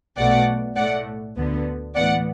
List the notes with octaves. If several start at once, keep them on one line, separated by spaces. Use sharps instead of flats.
B1 B2 A3 D5 F#5
A2 A3 D5 F#5
D2 D3 B3
A2 E3 B3 D5 F#5